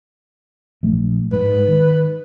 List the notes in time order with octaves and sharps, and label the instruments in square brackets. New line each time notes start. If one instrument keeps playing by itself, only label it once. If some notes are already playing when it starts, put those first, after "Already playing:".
[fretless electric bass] A#1 F3 A3
[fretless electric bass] G#2 [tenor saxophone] B4
[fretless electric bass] D#3